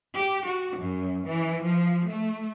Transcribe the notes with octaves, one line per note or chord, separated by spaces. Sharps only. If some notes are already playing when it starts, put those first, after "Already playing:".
G4
F#4
F#2
E3
F3
A3